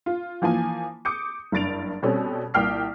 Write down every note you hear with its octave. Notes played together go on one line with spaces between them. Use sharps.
F4
E3 F3 A#3 G#5
D6 D#6 G6 C#7
F#1 G2 A6 D7 F7
B2 G3 C4 C#4 A4
C2 A#2 G5 F6 C7